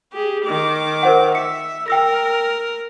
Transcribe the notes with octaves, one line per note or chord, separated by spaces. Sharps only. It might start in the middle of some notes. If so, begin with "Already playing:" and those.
G4 G#4
D#3 D6
A#4 C5 F#5
E5 C#7
A#4 G5 E6 A#6